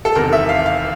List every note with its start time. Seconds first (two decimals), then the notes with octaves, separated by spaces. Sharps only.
0.05 A4
0.15 E1 E2 C3 D#3 A#4
0.33 E5
0.49 F5
0.66 F5